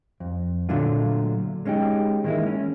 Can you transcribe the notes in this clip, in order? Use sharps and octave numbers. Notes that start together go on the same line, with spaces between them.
F2
A#2 D3 F#3 A3 D4 F4
G#3 C#4 D#4 G4
D#3 E3 G#3 A#3 E4
C#4